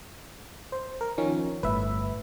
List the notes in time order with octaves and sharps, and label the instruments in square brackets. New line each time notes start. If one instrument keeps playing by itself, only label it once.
[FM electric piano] C5
A#4
D#3 F3 C#4
[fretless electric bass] G1 A2 [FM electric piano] B4 E5